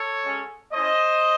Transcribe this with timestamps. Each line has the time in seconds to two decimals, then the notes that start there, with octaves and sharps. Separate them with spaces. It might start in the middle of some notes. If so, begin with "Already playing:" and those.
Already playing: A4 C#5
0.23 G#3 C#4 F#4
0.72 A3 C#4 E4 C5 D#5